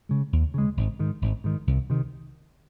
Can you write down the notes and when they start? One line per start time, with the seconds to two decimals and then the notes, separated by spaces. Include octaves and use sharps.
0.09 C#3 G#3
0.33 D#2
0.54 C#3 G#3
0.77 G#1
0.99 G#2 D#3
1.22 G#1
1.44 G#2 D#3
1.67 C2
1.90 C3 D#3